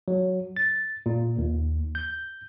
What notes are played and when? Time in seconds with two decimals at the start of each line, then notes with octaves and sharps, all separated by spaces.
0.08 F#3
0.57 A6
1.06 A#2
1.38 D#2
1.95 G6